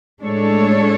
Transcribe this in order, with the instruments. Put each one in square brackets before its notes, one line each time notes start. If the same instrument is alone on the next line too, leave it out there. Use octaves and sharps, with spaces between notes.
[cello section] A2 G#3 D4 A4 C#5